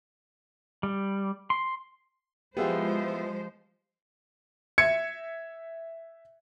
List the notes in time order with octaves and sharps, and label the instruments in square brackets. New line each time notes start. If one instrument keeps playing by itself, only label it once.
[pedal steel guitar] G3
C6
[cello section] F3 G#3 C5 [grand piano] B3 E4 F4 [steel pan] G4 G#4
[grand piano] E5 G#6 C#7